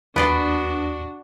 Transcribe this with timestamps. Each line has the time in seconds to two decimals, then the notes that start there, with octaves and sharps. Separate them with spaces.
0.16 D#2 B3 D4 F#4 B4 D5 C6